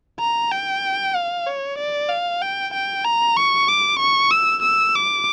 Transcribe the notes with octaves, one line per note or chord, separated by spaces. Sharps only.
A#5
G5
F5
C#5
D5
F5
G5
G5
A#5
C#6
D6
C#6
E6
E6
D6